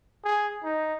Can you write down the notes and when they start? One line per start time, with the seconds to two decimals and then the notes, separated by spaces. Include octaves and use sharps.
0.24 G#4
0.63 D#4